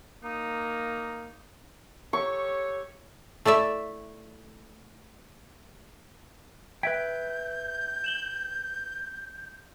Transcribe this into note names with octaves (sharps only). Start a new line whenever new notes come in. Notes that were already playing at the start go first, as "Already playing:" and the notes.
A#3 D#4
G4 A4 C#5 C#6
A3 E4 D5 E5
B4 E5 G5 G6 G#6 B6 D7
E7 F#7 G7